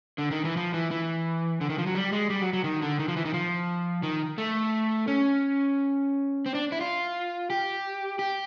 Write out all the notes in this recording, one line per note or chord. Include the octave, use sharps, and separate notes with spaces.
D3
D#3
E3
F3
E3
E3
D3
D#3
F3
F#3
G3
G#3
G3
F#3
F#3
D#3
D3
D#3
F3
E3
D#3
F3
D#3
A3
C#4
C4
D4
E4
F4
G4
G4